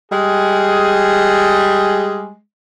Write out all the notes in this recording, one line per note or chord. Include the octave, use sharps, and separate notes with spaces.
G3 G#3 G#4